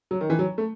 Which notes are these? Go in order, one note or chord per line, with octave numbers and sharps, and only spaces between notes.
F#3
D#3
E3
F#3
A3